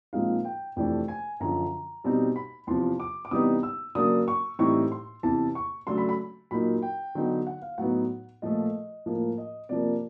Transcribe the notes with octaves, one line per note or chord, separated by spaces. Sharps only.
A#2 F3 G#3 C4 D#4 F5
G5
F2 C3 E3 A3 D4 G5
G#5
F#2 D3 F3 A#5
B2 G3 C4 D#4
B5
E2 C3 F3 C6
D6
D6
C3 E3 G3 B3 D#4 D#6
E6
C#3 F#3 A#3 D4 D#6
C#6
A2 E3 G3 C4 D#4 C#6
C6
E2 C3 E3 A5
C#6
C#3 F#3 A3 D4 C6
B5
B5
A#2 F#3 A#3 D#4 B5
G5
D3 F#3 B3 D#4
F#5
F5
A2 F#3 B3 D#4 F#5
A#2 F3 A3 D#5
A2 F3 A#3
D#5
C3 F3 A#3 D5